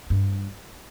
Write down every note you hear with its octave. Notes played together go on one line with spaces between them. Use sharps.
G2